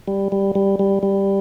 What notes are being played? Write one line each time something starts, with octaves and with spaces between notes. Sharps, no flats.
G3
G3
G3
G3
G3